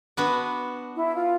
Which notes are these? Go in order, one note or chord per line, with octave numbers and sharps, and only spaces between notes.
B3 D4 F#4 B4
E4
F4